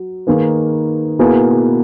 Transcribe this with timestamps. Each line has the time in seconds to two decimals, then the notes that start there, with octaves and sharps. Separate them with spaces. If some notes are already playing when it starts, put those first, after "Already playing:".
Already playing: F#3
0.27 D#3 A#3 D#4 G#4 B4
1.19 B2 A#3 E4 G#4 B4